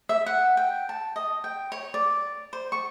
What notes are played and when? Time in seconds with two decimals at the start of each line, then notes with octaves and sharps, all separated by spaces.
0.09 E5
0.26 F#5
0.57 G5
0.89 A5
1.16 D#5
1.44 G5
1.72 C#5
1.94 D5
2.53 C5
2.72 C#6